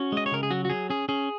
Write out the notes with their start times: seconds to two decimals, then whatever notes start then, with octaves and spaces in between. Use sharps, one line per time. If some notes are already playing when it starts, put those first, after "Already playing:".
Already playing: C#4 F#4
0.12 G#3 D#5
0.26 C#5
0.32 C#3 A#4
0.43 G#4
0.51 F#3 F#4
0.65 F#4
0.70 F#3 G#4
0.90 C#4 G#4
1.09 C#4 G#4